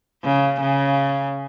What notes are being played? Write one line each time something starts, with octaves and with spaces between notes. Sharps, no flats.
C#3
C#3